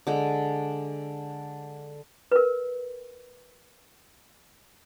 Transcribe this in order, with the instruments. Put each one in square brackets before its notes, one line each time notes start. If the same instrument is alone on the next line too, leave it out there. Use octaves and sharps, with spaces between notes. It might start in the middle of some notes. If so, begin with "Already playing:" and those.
[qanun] D3 G#3
[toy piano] A#4 B4